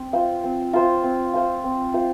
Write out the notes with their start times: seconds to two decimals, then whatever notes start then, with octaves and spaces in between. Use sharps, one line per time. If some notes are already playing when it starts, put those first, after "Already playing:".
Already playing: C4
0.13 F4 C5 F5
0.44 C4
0.73 F4 C5 F5
1.04 C4
1.34 F4 C5 F5
1.64 C4
1.94 F4 C5 F5